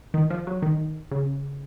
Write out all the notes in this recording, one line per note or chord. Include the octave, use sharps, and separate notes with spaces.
D#3
F3
F#3
D#3
C#3